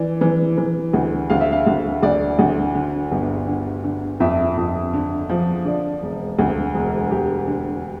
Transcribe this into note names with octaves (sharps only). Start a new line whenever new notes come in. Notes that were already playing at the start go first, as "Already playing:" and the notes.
Already playing: E3 D5
E3
E3
D2
D2 F5
E5
F5
D2
D2 D5
D2
D3
G1
D3
D3
F2 E5
F2
D3
F3
D3 D5
E1
D2
E1
E1 G4
D3